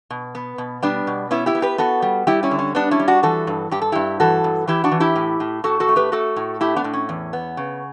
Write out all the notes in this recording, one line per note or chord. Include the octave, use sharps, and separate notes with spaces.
B2
B3
B2
G3 B3 D4
B2
B3 C#4 E4
E4 G4
B3
G4 B4
B3 F#4 A4
G3
G3 E4 G4
C#4 E4
D3
C#4
G3 B3 D4
C#4 E4
G3
D4 F#4
E3 F#4 A4
G2
G2 G4
A4
G2 E4 G4
E3 F#4 A4
G2
E3 E4 G4
D4 F#4
E3
E4 G4
A2
A2
A2 F#4 A4
F#4 A4
A3
G4 B4
A3 F#4 A4
A2
A3 E4 G4
B3 D4
A2
C#4
E2
B3
C#3